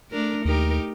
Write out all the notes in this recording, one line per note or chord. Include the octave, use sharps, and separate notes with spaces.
A3 D4 A#4
D#2 D#4 G4 A#4